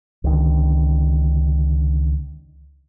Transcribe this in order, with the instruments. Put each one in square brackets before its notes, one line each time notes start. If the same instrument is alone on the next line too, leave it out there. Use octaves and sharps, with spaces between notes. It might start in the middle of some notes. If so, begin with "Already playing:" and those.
[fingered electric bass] C#2 D3 D#3